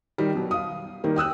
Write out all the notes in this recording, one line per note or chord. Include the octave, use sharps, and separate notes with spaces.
D#3 G3
B2 F#3
F5 D#6
D#3 G3 A#3
G5 D#6 E6 F#6